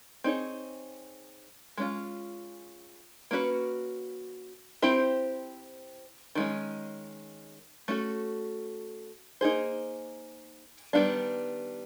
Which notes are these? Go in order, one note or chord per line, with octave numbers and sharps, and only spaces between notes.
C4 D#4 G#4 C#5
G#3 C#4 F4
A#3 C#4 F#4 B4
C4 E4 G4 C5
D#3 G#3 C#4
A3 C#4 F#4 A4
A#3 D#4 G#4 C5
D#3 G3 B3 D4